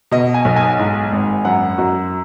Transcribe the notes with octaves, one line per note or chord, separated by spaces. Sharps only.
B2 D#5
G#5
B1
G#5
G#2
G#1
F#2 F#5
F#2 F#4